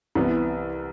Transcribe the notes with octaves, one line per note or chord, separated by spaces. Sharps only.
C2 C3 E3 B3